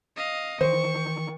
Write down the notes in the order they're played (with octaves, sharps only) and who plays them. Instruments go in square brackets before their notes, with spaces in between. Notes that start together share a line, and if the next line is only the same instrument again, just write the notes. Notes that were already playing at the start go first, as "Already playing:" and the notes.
[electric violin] D#5 F5
[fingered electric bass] D#3 E3 [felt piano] C5 [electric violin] C#6